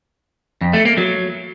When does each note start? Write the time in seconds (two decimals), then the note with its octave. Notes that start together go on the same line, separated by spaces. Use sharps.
0.61 F2
0.73 A3
0.85 A#3
0.97 F#3